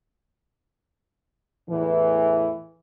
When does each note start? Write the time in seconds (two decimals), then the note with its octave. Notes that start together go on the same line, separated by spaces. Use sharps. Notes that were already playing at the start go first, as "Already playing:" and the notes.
1.70 E2 A2 E3